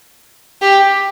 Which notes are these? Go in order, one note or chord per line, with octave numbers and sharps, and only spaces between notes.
G4